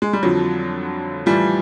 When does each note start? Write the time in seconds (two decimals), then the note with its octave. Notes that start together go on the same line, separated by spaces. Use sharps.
0.02 G#3
0.13 G3
0.23 F2 D3 F3 F#3
1.26 A2 E3 F3 G3